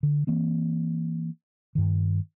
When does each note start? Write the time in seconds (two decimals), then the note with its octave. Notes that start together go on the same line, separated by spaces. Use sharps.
0.03 D3
0.27 E3 A#3 C4
1.75 G2 D#3